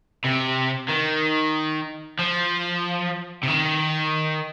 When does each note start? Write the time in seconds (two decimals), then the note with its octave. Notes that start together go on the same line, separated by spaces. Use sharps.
0.24 C3
0.88 D#3
2.19 F3
3.43 C3
3.48 D#3